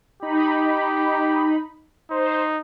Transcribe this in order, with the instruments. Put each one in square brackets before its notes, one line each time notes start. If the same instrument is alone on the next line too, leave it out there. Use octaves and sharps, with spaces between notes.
[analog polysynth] D#4 B5 [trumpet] G4
[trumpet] D#4 [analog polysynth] C5